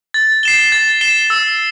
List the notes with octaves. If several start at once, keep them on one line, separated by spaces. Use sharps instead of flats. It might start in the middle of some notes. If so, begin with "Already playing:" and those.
A6
C7 E7 G7
A6
C7 E7 G7
E6